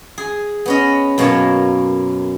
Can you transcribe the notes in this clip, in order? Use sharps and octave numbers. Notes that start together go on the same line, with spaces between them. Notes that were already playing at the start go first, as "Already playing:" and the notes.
G#4
B3 C#4 D#5
F#2 B2 A#3 C#5 A5